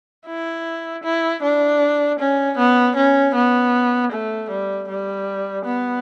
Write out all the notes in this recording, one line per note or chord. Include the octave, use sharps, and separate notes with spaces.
E4
E4
D4
C#4
B3
C#4
B3
A3
G3
G3
B3